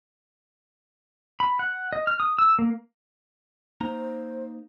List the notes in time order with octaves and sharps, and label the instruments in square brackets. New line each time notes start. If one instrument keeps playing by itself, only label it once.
[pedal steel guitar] B5
F#5
D#5
F6
D#6
E6
A#3
[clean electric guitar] A#3 D#4 A#5 [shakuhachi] C5